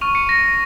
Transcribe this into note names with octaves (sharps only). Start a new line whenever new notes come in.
C#6 F6 D#7 F7
C#7 D#7
A#6